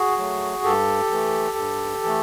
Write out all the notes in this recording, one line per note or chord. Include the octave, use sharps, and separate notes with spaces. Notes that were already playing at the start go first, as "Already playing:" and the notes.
Already playing: F#4 G#4
F#3 A3
G2 G4 A4
E3 A3
G2
E3 A3